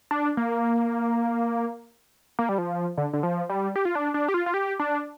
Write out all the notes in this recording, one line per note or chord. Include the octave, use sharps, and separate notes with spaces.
D4
A#3
A#3
G3
F3
D3
D3
F3
G3
G4
F4
D4
D4
G4
F4
F4
G4
D4